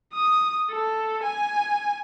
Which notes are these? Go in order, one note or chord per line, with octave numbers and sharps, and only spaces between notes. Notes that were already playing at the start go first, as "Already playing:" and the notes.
D#6
A4
G#5